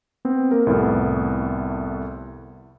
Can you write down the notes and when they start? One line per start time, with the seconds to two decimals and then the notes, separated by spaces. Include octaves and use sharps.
0.25 B3 C4
0.51 A#3 A#4
0.67 C2 F2 A2 B3